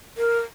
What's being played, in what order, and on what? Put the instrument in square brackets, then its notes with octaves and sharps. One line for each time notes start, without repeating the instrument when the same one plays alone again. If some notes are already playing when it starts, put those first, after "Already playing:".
[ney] A#4